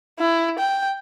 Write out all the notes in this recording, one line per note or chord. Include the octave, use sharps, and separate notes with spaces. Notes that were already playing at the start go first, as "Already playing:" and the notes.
E4
G5